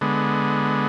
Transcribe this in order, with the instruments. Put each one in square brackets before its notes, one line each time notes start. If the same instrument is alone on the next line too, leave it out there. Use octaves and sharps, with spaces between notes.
[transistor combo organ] D3 G#3 B3